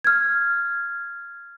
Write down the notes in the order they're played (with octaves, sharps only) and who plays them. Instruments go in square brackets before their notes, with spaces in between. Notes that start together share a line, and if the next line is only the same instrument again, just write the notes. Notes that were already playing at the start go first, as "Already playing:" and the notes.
[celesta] F6 G#6